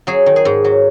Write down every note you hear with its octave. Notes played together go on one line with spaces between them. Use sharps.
F#3 G#4
D#3
G#4
G#2
F#3